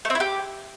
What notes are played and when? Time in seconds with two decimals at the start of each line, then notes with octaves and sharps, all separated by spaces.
0.05 A3
0.10 C4
0.15 E4
0.20 G4